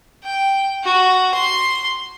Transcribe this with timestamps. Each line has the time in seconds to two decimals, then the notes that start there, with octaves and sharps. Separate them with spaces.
0.24 G5
0.84 F#4
1.34 C6